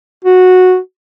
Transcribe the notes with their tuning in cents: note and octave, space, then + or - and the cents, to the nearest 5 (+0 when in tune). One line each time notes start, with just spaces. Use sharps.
F#4 -10